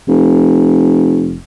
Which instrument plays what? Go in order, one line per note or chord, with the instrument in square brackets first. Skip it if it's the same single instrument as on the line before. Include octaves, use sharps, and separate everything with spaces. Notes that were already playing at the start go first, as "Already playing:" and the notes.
[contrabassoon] F1